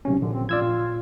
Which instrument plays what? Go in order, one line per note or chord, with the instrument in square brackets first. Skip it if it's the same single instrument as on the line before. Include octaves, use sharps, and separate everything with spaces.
[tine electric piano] B1 C3 C#4
[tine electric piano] A#1 [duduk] D3
[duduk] C4
[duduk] F4 [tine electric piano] D5 E6 G#6
[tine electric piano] A#2